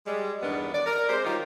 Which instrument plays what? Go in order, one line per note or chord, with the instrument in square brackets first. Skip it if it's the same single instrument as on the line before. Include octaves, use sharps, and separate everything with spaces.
[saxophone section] G3 G#3
E2 G2 D#3 B3 D4
D5
A#4
G#3 C4 G4 C5
D#3 F#3 G3 D#4 F4 G4